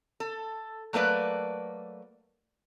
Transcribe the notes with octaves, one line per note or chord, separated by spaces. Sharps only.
A4
F#3 A3 A#3 B4 D5